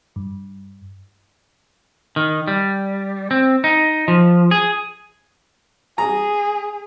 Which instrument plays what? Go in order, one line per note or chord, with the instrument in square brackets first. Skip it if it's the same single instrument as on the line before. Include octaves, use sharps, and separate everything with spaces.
[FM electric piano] G2
[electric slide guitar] D#3
G3
C4
D#4
F3
G#4
[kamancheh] G#4 [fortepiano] A#5